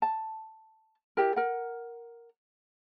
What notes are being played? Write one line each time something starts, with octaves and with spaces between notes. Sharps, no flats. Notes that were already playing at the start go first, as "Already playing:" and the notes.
A5
E4 G4 A#4
A#4 F#5